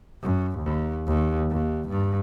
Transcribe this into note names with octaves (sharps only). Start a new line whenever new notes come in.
F#2
D#2
D#2
D#2
G2